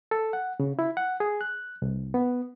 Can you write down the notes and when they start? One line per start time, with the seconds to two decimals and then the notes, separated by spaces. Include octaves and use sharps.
0.11 A4
0.33 F#5
0.60 C#3
0.79 E4
0.97 F#5
1.20 G#4
1.41 F#6
1.82 C2
2.14 B3